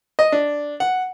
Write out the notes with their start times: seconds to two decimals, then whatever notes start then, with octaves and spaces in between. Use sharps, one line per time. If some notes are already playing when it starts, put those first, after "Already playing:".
0.19 D#5
0.32 D4
0.80 F#5